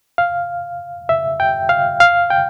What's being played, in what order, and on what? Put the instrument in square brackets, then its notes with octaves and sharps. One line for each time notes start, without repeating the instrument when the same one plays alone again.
[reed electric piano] F5
E5
G5
F5
F5
G5